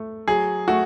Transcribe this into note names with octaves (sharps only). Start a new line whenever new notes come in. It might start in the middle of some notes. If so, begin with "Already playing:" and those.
Already playing: A3
F#3 G#4
A3 F#4